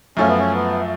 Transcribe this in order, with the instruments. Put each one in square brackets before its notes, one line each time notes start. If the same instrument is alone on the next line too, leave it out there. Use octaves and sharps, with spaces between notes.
[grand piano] F#2 F3 A3 F4 [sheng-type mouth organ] C#4
[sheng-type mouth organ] B3
C#4
B3